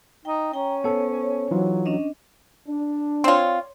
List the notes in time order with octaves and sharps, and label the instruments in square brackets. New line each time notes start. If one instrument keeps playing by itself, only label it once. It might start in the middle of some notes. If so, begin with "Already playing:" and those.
[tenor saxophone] D#4 [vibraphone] G5
[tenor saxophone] C#4 [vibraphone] G5 A#5
[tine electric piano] B3 A4 [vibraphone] C5 C#5
[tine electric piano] E3 D#4 F4 [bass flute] F#3
[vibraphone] C#4 D4 D#5
[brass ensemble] D4
[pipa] C4 F4 [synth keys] C#5 D5 C6